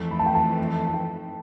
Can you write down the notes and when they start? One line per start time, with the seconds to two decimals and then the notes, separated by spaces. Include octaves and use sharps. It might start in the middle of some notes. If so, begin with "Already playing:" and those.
Already playing: F2 E3 A3
0.11 B5
0.19 A5
0.26 G5
0.35 A5
0.87 A5
0.94 G5